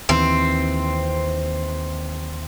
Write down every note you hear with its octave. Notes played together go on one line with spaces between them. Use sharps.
D#2 E3 C4